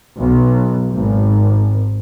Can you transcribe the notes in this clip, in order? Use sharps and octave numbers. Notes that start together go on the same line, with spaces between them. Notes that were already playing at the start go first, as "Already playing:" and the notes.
B1
G#1